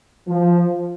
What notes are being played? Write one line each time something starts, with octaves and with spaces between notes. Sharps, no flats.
F3